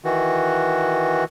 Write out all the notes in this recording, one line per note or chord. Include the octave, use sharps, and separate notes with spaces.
D#3 E3 F#4